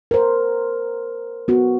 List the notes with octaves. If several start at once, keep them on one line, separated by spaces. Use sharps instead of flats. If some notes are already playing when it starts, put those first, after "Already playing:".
A#4 C5
B3 F#4